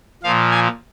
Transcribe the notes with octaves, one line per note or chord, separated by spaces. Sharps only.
A#2 F3 F5
G#5